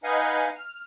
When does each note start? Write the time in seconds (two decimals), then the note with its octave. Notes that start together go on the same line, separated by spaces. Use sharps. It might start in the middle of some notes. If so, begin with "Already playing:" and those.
0.04 D#4 B4 D#5 F5 F#5 G#5
0.56 F6